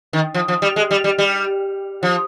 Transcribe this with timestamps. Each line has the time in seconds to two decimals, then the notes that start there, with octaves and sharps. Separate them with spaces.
0.13 D#3
0.34 F3
0.48 F3
0.62 G3
0.76 G#3
0.91 G3
1.04 G3
1.18 G3
2.03 F3